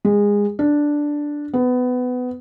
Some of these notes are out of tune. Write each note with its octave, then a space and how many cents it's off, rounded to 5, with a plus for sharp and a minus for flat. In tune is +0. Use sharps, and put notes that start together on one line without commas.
G#3 -20
D4 +0
B3 +20